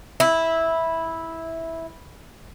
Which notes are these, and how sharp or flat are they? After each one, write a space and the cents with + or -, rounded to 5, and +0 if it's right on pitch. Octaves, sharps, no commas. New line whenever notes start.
E4 -10